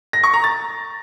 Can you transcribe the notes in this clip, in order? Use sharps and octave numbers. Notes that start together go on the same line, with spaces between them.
A#6
C#6
A#5
A6